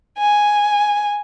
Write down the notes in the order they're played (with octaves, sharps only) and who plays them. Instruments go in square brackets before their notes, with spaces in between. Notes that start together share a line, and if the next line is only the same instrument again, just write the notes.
[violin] G#5